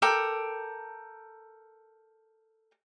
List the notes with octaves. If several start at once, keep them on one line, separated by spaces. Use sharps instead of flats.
A4 A#4 G5 D6